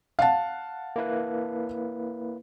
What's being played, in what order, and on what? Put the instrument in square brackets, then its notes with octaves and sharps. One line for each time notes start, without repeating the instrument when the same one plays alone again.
[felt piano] F5 F#5 A5
[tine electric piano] A#3 E4 B4